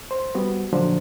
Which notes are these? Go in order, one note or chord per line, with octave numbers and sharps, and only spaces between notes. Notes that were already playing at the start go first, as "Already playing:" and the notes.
C5
G3 B3 F#4
A#2 D3 F3 F#3 D4 C5